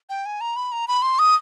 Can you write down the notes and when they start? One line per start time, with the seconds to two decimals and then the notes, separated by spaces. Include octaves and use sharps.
0.10 G5
0.26 G#5
0.41 A#5
0.56 B5
0.72 A#5
0.88 B5
1.02 C6
1.19 D#6